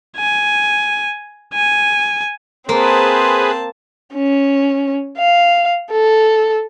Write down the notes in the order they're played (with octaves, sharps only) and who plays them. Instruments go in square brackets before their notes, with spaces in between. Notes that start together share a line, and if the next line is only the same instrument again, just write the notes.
[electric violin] G#5
G#5
[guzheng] A#3 [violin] C4 A5 [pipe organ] G#4 B4 [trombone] C5
[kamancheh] C#4
F5
A4